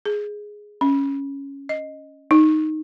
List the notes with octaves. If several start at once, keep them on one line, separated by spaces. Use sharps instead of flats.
G#4
C#4
D#5
D#4